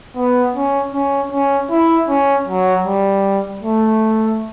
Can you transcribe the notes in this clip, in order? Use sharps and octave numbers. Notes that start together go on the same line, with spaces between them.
B3
C#4
C#4
C#4
E4
C#4
F#3
G3
A3